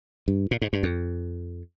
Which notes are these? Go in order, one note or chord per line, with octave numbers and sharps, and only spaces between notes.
G2
A#2
G#2
G2
F2